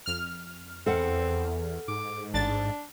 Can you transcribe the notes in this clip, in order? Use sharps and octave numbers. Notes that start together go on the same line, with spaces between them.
F2 F6
E2 C4 A4 F#5
G#2 D6
A1 D4 A6